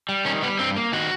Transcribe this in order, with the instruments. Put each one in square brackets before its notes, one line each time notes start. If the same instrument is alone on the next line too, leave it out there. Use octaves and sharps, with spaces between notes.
[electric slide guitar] G3
D#3 C#4
G3 B3
G2 C4
A#3
D#3 F#4